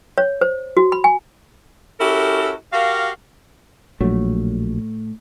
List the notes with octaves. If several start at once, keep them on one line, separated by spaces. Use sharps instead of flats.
C#5
C5
F#4
B5
G#5
C#4 E4 F#4 G4 A4 A#4
F#4 G4 A#4 F5
A#1 A2 F#3 A3